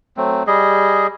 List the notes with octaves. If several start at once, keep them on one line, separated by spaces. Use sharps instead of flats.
F#3 A3 C4
G3 G#4 D#5